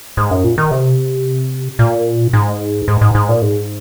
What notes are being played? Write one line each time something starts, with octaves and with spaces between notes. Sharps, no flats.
G#2
F#2
A#2
D#3
C3
A#2
G#2
G#2
G#2
G#2
A#2
G#2